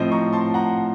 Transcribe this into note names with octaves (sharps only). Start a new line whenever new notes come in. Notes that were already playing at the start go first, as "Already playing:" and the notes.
Already playing: A2 F3 C4 C5 D#5
A#5 C#6
A5 C6
F#5 A#5